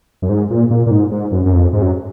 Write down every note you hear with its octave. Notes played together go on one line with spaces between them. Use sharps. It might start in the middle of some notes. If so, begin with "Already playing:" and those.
F#2
G#2
A#2
A#2
A#2
G#2
G#2
F#2
F#2
F2
G#2
F#2